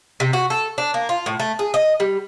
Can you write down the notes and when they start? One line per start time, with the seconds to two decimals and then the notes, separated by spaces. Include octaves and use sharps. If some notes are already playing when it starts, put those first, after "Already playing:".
0.20 C3
0.33 F#4
0.50 A4
0.78 D4
0.94 A#3
1.09 F4
1.26 A2
1.40 A3
1.59 G#4
1.74 D#5
2.00 G3